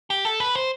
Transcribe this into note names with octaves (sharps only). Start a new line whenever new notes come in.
G4
A4
B4
C5